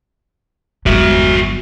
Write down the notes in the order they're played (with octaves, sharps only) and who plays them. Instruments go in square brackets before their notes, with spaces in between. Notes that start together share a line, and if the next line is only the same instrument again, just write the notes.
[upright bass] G1 F#3 [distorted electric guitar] F#4 E5